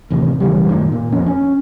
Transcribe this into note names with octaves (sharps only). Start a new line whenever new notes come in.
A1 D#2 C3
B1 C#3 E3 G3
F#2 A2 D#3
A#2
D#1 F2 C#4
C#4